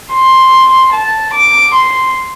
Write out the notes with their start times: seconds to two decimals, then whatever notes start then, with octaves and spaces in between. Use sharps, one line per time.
0.11 C6
0.92 A5
1.33 D6
1.74 C6